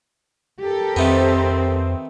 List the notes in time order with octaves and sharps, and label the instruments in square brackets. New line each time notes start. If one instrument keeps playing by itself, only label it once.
[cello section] G4 A4 A#4
[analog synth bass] F2 [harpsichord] D#3 A3 B3 [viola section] C4